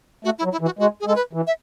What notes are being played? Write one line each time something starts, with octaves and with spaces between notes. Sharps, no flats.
A3 F#4
E4
F#3
E4
E3
F#4
G#3 F#4
G#4
G#3 A4
B4
E3
E5